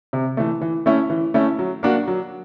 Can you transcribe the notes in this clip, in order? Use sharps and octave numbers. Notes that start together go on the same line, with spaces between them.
C3
E3 A3
E3
A3 C#4 E4
E3
A3 C#4 E4
F#3
A#3 D4 F#4
F#3